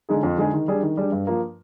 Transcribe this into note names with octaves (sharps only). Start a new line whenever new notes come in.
D3 G#3 D#4 G#4
F2
D3 G#3 D#4 G#4
D#3
G3 D4 G#4
D#3
G3 D4 G#4
G2
F3 A#3